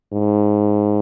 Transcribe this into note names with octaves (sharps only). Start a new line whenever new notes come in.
G#2